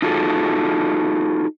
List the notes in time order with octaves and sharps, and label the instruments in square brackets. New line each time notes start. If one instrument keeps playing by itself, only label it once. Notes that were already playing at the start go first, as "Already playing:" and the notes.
[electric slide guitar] D#4 F4 F#4 G#4 A4